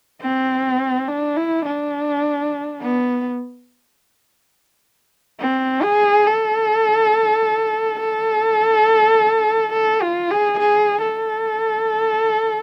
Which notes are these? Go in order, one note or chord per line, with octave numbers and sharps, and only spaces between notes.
C4
D4
E4
D4
B3
C4
G#4
A4
A4
A4
F4
G#4
G#4
A4